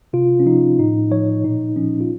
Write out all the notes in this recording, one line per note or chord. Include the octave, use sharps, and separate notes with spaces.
C3 F4
C#4
F3 D#4
A2 D#4
F3 C#5
A#2 D#4
F3 C#4
F4